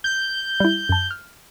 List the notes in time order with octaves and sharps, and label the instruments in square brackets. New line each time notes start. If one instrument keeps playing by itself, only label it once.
[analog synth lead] G6
[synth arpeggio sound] G3 E4
F#2 A5
F6